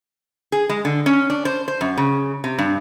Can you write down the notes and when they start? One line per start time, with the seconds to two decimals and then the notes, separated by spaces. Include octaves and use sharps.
0.52 G#4
0.69 G#3
0.85 D3
1.06 C#4
1.30 D4
1.45 C5
1.68 C5
1.81 F#2
1.97 C#3
2.44 C3
2.59 G2